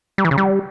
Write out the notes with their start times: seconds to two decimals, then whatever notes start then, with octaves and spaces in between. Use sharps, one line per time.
0.18 G3
0.25 E3
0.31 C#3
0.38 G3